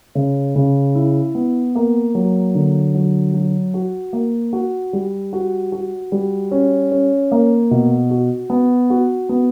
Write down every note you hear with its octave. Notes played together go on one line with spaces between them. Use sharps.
C#3
C#3
E4
B3
A#3
F#3
D3
F#3
F#3
F#4
A#3
F#4
G3
F#4
F#4
G3
C#4
C#4
A#3
B2
F#4
B3
F#4
B3